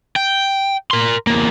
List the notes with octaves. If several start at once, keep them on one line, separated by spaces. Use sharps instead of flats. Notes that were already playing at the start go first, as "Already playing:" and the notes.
G5
A#4 C6
E2 A#3